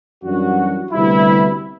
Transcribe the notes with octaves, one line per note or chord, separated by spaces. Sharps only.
F#2 E3 G3 D4 F#4
D2 C3 G3 B3 E4